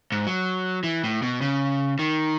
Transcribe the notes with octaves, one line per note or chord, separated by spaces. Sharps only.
G#2
F#3
E3
A2
B2
C#3
D#3